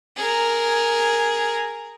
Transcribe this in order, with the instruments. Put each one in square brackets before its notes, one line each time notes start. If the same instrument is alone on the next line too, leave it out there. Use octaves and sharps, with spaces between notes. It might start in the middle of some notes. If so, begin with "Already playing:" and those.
[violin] G#4 A#4